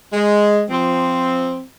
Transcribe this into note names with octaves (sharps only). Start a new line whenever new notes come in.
G#3
F3 C4